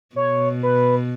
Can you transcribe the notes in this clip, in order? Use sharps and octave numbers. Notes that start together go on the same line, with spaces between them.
B2 C#5
B4